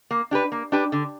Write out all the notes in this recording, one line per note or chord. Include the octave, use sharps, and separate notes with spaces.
A#3
D4 G4 B4
A#3
D4 G4 B4
D3